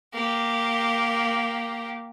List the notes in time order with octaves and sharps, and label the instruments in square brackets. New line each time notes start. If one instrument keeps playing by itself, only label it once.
[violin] A#3 G4